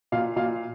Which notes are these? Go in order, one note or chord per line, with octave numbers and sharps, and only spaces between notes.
A#2 F5
A#2 F5